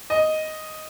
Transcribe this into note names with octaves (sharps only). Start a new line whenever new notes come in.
D#5